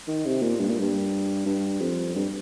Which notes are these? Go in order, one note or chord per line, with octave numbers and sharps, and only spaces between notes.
D#3
C3
A#2
G2
A#2
G2
G2
F2
G2